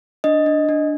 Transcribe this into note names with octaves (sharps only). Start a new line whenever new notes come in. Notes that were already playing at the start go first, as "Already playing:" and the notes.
D4 D#5
D4
D4